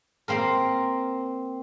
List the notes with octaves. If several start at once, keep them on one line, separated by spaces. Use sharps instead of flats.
A#3 C4 A#4